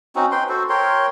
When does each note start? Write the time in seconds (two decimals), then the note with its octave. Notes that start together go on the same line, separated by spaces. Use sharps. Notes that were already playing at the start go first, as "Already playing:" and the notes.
0.16 C4 C#4 D#4 F#4
0.32 B4 G5 C6
0.49 F#4 A4 C5
0.69 A#4 C#5 G5 C6